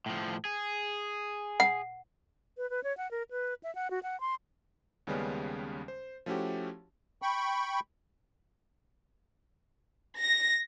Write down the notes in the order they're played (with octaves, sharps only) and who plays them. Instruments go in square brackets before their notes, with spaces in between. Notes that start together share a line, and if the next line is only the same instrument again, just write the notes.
[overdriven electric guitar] A2 F3
G#4
[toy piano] F#5
[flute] B4
B4
C#5
F#5
A#4
B4
E5
F#5
F#4
F#5
C6
[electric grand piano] D#2 C#3 G3 G#3 B3 C#4
C5
F3 A3 C#4 E4 F#4 G4
[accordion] G5 B5 C#6
[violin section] A#6